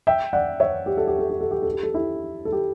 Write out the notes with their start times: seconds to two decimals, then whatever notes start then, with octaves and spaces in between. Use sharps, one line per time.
0.07 E5 G5
0.33 D5 F#5
0.60 C#5 E5
0.86 G4
0.97 A4
1.08 G4
1.19 A4
1.30 G4
1.41 A4
1.51 G4
1.62 A4
1.73 G4
1.83 A4
1.94 E4 G4
2.45 A4
2.52 G4